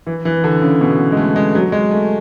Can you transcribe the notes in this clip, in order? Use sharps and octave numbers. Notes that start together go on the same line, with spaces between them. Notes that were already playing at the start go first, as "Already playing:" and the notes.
E3
E3
D3
C#3
B2
G#3
A3
G#3
F#3
G#3
A3